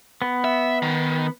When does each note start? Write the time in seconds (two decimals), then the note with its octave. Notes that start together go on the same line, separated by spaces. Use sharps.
0.22 B3
0.44 E5
0.82 D#3